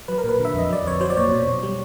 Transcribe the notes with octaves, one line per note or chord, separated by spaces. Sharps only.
F#3 B4
A#4
A#2
B4
D3
E5
F2 D#5
F#3 D5
F2 C#5
F#3 C5
D5
A#2 C#5
B2
B2
G3